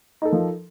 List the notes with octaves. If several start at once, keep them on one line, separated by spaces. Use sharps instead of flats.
F3 D#4 A4 A#4